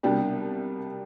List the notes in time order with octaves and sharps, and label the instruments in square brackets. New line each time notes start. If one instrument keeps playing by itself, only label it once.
[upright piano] C2 B2 G3 A#3 D4 G4